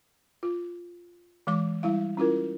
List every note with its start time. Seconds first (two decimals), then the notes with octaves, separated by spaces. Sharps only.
0.43 F4
1.47 E3 G#3 D6
1.83 G3 E4 F5
2.17 C#4 E4 F4 A#4